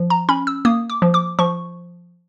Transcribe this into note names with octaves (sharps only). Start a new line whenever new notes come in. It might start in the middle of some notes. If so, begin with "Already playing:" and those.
Already playing: F3
A#5
C#4 B5
E6
A#3 D#6
D6
F3
D6
F3 C#6